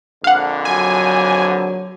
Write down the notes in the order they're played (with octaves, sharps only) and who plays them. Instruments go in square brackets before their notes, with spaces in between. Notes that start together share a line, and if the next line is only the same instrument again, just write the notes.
[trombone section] A#1 F2 D3 [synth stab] F5 F#5
[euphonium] F#3 [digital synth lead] G#5